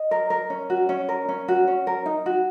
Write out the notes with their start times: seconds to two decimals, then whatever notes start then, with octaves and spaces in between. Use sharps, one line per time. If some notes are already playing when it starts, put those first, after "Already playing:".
Already playing: D#5
0.11 A#4
0.30 A#4
0.50 C#4
0.70 F#4
0.89 C#4
1.09 A#4
1.29 C#4
1.48 F#4
1.68 C#4
1.87 A#4
2.06 D#4
2.26 F#4